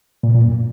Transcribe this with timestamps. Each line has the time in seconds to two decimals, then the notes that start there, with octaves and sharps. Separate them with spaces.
0.23 A#2
0.35 A#2
0.45 F#2